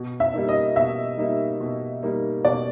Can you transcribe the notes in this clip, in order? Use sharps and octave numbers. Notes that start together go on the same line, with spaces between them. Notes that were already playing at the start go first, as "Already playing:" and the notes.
Already playing: B2
E5
G3 A#3 D#4
D#5
B2 E5
G3 A#3 D#4
B2
G3 A#3 D#4
B2 D5